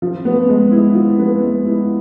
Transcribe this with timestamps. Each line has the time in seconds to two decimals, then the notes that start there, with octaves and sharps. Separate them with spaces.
0.02 F3
0.25 B3
0.49 G#3
0.71 E4
0.95 F3
1.19 B3
1.42 G#3
1.65 E4